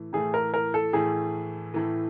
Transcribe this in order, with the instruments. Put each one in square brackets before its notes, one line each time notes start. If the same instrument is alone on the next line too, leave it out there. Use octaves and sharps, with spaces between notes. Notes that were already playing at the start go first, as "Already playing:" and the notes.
Already playing: [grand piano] A2 E3 A3
[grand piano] A2 E3 A3 [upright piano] G#4
[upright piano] A#4
A#4
A4
[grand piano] A2 E3 A3 [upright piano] G#4
[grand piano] A2 E3 A3